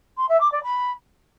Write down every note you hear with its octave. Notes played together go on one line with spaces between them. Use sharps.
C6
E5
D6
D5
B5